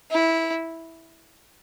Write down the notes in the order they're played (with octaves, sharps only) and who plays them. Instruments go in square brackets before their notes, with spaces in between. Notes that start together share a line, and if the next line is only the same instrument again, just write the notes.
[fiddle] E4